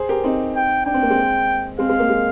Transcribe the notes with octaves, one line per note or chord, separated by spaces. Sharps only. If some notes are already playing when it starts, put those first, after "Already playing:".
Already playing: G#4 C5
G4 A#4
C4 D#4
G5
D4 G5
C4
A#3
G#3 C4
G#3 C4 F5
G#3 C4
A#3
G#3